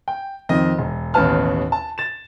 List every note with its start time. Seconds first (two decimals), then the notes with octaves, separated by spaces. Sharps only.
0.08 G5
0.49 F2 D#3 D#5
0.79 E1
1.14 A1 D#2 B2 B4 A5 F6
1.72 A5
1.98 A6 E7